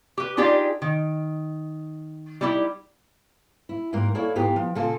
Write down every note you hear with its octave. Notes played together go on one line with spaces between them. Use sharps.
G4 B4
D4 D#4 F4 G4 G#4 D5
D#3
G3 D#4 E4 G4
E4
G#2 G3 A#3 A#4
A#3 E4 A4 C#5 D5
G#2 A#3 B3 G4 A#5
F3
A#2 C#3 A#3 F4 A4 A5